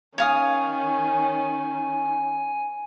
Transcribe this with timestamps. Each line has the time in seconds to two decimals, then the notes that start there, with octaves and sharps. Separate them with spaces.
0.18 D#3 C#4 C#5 F5 G#5 D#6